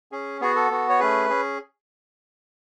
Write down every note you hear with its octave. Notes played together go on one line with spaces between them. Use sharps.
C#4 G#4
B3 F#4 G#4
A4
B3 F#4
C#5
A3 C#4 G#4 B4
C#4 G#4